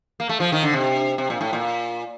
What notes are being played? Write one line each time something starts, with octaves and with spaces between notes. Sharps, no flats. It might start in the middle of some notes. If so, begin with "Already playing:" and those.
A#3
A3
F3
D#3
D3
C3
C3
A#2
A2
A#2